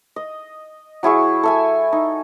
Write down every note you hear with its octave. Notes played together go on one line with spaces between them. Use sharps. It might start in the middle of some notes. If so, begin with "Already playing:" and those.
D#5
F#3 E4 G#4 C#6
A4 E5 G#5
D#4